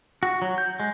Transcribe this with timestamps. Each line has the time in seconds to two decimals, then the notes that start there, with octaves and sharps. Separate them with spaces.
0.23 F#4
0.42 F#3
0.58 G6
0.80 G#3